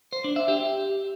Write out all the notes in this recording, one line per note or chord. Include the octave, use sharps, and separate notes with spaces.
C5
D4
E5
G4